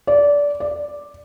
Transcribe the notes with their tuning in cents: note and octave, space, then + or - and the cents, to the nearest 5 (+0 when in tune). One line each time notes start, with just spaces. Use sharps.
D5 -20
D5 +5